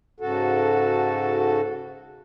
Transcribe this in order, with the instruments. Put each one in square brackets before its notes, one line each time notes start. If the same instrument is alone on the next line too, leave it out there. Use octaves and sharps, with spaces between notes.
[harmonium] G#2 C#3 F#4 A4